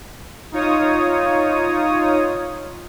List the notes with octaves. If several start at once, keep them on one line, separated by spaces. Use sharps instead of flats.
D#4 F4 C#5 D#6